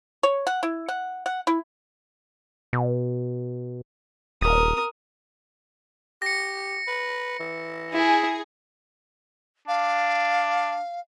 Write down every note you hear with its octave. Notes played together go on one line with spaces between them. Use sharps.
C#5
F#5
E4
F#5
F#5
E4
B2
D#1 A#4 D#6
G4 A#6 C#7
B4
E3
E4 G#4
D4 F5